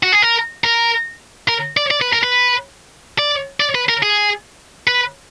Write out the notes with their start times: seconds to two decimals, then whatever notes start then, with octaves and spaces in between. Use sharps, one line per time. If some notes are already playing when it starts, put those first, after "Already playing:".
0.03 F#4
0.12 G#4
0.22 A#4
0.64 A#4
1.49 A#4
1.77 D5
1.91 D5
2.02 B4
2.13 A#4
2.23 B4
3.19 D5
3.60 D5
3.75 B4
3.89 A#4
4.03 G#4
4.87 B4